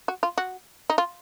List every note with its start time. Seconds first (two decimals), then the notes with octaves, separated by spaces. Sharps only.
0.08 F#4
0.23 F4
0.38 F#4
0.90 D#4
0.98 F4